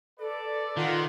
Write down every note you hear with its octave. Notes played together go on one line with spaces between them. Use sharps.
A4 B4 D5
D#3 F4 F#5 C6